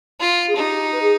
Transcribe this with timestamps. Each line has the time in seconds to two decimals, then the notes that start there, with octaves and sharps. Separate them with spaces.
0.20 F4
0.48 G#4
0.56 D#4 G4
0.92 B4
1.02 G#4